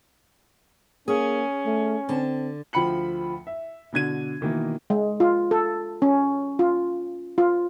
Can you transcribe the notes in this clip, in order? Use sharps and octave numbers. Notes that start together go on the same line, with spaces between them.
A#3 C#4 G#4
A3
D3 C4 A5
D2 F3 G5 B5 C#7 F#7
E5
B2 D3 G#6 D#7
B2 D#3 E3 A#3
G#3
F4
A4
C#4
F4
F4